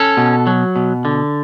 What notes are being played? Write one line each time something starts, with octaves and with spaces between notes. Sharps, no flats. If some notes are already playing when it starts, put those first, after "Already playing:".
Already playing: C#4 A4
B2
F#3
B2
D3